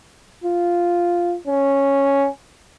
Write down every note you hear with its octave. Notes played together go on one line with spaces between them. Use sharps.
F4
C#4